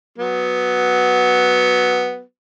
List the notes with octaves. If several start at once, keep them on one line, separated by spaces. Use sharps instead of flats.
F#3 B3